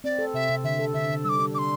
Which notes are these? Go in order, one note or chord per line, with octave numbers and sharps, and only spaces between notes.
C4 D5
A4
C3 E5
C3
D3 E5
A4
D3 E5
D3
G3 D6 E6
D4
D4 C6 D6